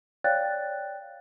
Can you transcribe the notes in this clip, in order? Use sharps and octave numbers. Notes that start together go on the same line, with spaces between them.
C#5 D5 F5 G5 F#6 A6